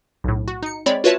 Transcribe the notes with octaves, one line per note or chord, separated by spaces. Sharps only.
B1 A2
F#4
D#4 C#7
G#3 C4 C#5 D5 B5
F4 F#4 B4 C#5 E5 A5